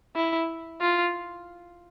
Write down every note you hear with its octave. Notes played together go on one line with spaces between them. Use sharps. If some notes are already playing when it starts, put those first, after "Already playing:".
E4
F4